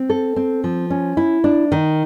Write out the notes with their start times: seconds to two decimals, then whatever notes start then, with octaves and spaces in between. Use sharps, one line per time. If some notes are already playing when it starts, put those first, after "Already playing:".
Already playing: C4
0.10 A4
0.36 C4
0.64 F3
0.90 C#4
1.17 E4
1.44 D4
1.72 D#3